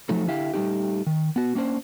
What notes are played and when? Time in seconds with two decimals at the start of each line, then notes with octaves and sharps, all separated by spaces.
0.09 F3 F#3 A3 D#4 A4
0.28 D3 E4 G4 E5 F5
0.54 G3 A3 D#4 G4
1.07 D#3
1.36 B3 F#4
1.55 A#3 C#4 D4 C5